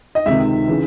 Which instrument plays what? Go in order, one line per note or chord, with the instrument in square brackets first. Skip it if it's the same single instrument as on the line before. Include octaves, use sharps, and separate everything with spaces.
[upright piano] D#5
C#2 C3 D#3 E5
C#3 E3